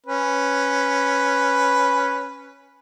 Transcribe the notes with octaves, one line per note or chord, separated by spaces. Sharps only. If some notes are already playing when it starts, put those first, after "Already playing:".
C#4 B4